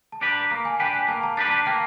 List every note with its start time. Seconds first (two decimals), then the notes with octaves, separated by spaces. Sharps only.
0.12 A5
0.21 D4 G4 B4
0.32 A#5
0.50 A#3 A#5
0.65 G#5
0.80 D4 G4 B4 G5
0.94 G#5
1.08 A#3 A5
1.23 A#5
1.37 D4 G4 B4 A5
1.51 A5
1.66 A#3 G5